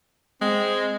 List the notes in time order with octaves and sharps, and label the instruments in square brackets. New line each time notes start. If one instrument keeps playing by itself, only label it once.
[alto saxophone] G#3 [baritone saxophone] C4